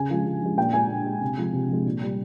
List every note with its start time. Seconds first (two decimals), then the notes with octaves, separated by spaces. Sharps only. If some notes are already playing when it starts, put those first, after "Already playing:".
Already playing: C#3 G#5
0.10 F3 G#3
0.26 C#3
0.42 F3 G#3
0.57 A#2 G5
0.73 G#3 G#5
0.90 A#2
1.06 G#3
1.21 C3
1.38 F3 G#3
1.53 C3
1.69 F3 G#3
1.86 A#2
2.02 G3